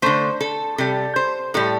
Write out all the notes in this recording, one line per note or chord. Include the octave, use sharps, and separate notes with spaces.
D3 A3 C5
A4
C3 G3 A4
C5
A2 G3 A4